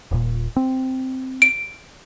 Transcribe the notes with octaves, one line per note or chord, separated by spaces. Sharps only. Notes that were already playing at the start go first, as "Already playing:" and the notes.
D#1 A#2
C4
D7